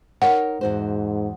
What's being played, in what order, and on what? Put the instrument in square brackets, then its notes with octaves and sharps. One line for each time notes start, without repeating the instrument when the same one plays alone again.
[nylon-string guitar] D#4 A#4 C#5 [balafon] F#5
[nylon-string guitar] E2 F#4 C5 [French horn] G#2